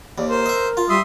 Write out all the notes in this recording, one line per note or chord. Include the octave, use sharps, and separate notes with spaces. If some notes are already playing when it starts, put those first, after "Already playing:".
D#2 D5
A#4 C5
D#5 E5
F4
G3 E5 C6 D#6